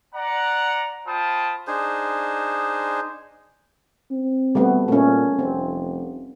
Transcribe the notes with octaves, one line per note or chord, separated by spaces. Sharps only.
D5 F#5 A#5
F4 C5 G5 A5 B5 D#6
D4 D#4 G#4 C5
C4
G3 A3 B3
A#2 A3 C#4
F1 C4